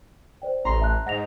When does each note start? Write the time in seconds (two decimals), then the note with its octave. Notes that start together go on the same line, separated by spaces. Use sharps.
0.42 C5 D5 G5
0.65 A1 A#5 C6
0.81 E5 A5 F#6
1.06 G#2 F#5 A#6 F7